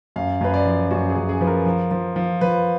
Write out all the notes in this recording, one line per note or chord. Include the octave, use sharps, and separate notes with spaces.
F#2 F5
F#2 B4
D5
F3
F#2 F#4
G#4
F#2
G#4
F3 B4
A#4
F3
F3
F3
F3 B4